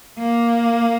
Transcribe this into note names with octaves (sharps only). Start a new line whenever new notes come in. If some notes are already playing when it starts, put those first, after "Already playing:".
A#3